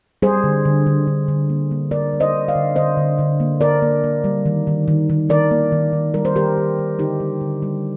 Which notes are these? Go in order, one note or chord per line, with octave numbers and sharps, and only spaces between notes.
G3 G#4 C5
D3
D3
D3
D3
D3
A#3
A#3
A#3 A#4 D5
G3
C5 D#5
D3
D5 F5
D3
D3 C5 D#5
D3
D3
A#3
A#3 A#4 D5
A#3
A#3
G3
D#3
D#3
D#3
D#3
D#3 A#4 D5
A#3
D#3
D#3
G3 A#4
C5
D#3 G4 A#4
D#3
D#3
D3 D#4 G4
G3
D3
G3